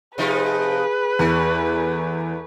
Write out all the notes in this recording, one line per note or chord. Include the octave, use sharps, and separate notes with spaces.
C3 F3 D#4 G#4 B4
E2 A3